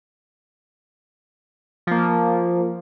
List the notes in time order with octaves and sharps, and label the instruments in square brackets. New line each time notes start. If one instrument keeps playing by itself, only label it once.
[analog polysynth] F3 A#3